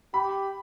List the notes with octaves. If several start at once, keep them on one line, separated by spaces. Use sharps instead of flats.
G4 B5